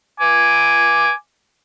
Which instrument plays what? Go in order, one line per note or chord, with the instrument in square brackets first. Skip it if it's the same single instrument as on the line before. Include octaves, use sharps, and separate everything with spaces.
[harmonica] G#5 D6